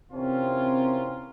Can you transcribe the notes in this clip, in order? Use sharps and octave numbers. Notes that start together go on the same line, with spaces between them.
C3 E3 C4 C#4 F4 A#4